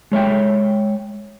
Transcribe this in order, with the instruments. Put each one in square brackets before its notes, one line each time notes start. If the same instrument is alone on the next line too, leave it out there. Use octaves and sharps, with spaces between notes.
[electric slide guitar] G#3 C#5 E5 G5